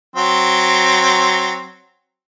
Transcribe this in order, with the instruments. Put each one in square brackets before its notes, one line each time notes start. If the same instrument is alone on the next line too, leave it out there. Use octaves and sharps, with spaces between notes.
[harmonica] F#3 C4